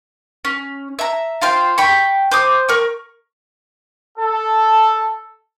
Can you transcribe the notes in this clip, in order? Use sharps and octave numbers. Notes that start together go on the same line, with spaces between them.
C#4
E5 A#5
F4 C5 F5 G5
G5 B5 C#6
C5 D6 D#6
A#4 C#6
A4